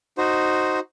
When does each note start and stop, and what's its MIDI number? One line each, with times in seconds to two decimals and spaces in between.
0.18 0.80 63
0.18 0.80 66
0.18 0.80 72